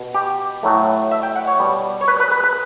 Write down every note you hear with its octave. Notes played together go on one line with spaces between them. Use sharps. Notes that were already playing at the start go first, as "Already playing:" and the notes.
Already playing: B2
G4
A2 F#3 A3
E5
G5
F#5
C#5
B2 G3
C#5
B4
B4
B4
B4